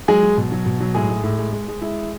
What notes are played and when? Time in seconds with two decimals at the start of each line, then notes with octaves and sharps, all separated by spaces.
0.08 F#3 G#3 G#4
0.23 F#3
0.37 B2
0.52 F#3
0.66 B2
0.80 F#3
0.95 A2 G#3 G#4
1.10 G#3
1.24 A2
1.38 G#3
1.53 G#3
1.68 G#3
1.81 G#3 E4